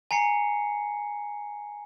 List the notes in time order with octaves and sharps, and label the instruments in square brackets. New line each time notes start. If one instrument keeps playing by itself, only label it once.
[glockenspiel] G#5 A#5 C7 C#7